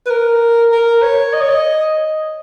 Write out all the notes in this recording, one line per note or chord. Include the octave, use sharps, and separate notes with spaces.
B4
A#4
A#4
C#5
D#5
C#5
D#5